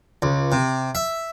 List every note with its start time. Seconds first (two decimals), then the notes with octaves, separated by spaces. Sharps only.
0.22 C#2
0.52 C3
0.95 E5